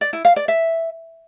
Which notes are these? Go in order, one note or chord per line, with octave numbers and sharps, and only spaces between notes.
D5
E4
F5
D5
E5